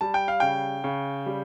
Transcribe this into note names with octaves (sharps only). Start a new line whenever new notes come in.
G3 A5
G5
F5
C#3 G5
C#3
G3